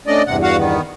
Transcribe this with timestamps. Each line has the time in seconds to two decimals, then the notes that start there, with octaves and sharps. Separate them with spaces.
0.07 A3 C#4 D4 D5 D#5
0.27 E2 G2 C3 F#5
0.43 F#4 F5 F#5
0.58 D#3 B3